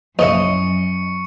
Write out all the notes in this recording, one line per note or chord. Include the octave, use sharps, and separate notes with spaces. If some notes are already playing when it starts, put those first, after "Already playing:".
A#1 F#2 C#3 E4 D#5 C#6 C#7